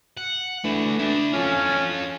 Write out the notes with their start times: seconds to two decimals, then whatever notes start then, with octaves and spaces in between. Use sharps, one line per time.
0.17 F#5
0.65 E3 A3 D4
0.99 D4 E5
1.34 C#4 F4 A4